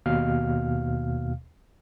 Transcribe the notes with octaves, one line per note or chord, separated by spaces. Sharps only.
D#2 B2 F5 F6